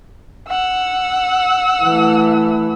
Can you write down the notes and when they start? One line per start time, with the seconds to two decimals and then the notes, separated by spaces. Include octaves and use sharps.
0.49 F#5 E6
1.83 E3 A3